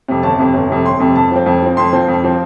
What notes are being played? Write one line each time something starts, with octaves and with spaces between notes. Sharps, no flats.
F2 C3
G1 A5
F2 C3
G1
F2 C3
G1 C6
F2 C3
F2 A5
F3 C4
F2
F3 C4
F2 C6
F3 C4
F2
F3 C4